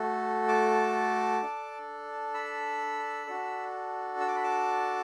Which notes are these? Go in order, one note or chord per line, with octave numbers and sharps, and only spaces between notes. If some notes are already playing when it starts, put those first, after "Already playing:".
Already playing: A3 F#4 A4
A5 D6
D4 A4
B5 E6
D4 F#4 A4
E6
D6
B5
A5 D6